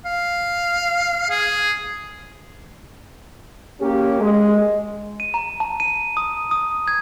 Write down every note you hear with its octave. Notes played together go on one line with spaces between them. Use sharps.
F5
G#4
A#3 C#4 G4
G#3
D#7
A#5
A5
D#7
D#6
D#6
G#6